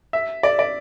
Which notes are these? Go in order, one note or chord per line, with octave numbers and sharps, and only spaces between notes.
E5
D5
D5